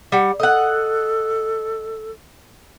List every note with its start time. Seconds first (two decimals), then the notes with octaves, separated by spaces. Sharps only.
0.12 G3 F#5
0.40 A4 D#5 F#5